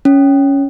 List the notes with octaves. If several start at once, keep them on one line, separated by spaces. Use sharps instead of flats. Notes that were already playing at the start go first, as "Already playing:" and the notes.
C#4